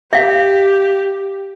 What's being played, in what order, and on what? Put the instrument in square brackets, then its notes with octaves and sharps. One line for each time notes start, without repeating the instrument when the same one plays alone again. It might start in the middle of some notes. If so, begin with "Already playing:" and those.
[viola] G4 [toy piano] E5 F5